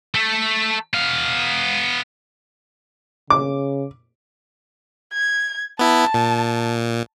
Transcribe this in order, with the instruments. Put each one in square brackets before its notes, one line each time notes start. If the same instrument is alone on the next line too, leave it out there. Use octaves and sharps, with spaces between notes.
[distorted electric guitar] A3 A4
B3 F5
[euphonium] C#3 [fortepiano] D6
[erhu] G#6
[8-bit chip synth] B3 E4 [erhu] A5
[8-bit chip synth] A#2